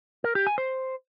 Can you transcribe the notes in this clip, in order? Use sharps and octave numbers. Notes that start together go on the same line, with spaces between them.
A#4
G4
G#5
C5